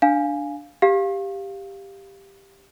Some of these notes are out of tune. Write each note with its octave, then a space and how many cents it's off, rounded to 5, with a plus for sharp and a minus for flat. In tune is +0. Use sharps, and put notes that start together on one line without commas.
D4 +0 F5 +0 G#5 +0
G4 +5 F5 +0